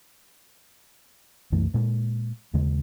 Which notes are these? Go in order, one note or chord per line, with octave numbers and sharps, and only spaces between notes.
C2 F#2 E3 A3
A#2 G#3
D#2 C#3 G#3